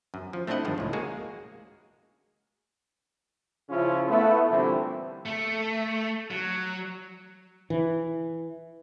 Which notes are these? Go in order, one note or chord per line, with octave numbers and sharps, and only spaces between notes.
F#2
F3
A3 C4 D4 E4 D#5 F#5
G2 D#3 F3 G#3
C#2 A2
G#3 A#3 F#4 G#4
C#3 F3 C#4 E4 F4
A3 B3 E4
A#2 D3 E3 G3 C4 E4
A3
F#3
E3